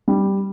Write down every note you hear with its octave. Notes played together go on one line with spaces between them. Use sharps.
G3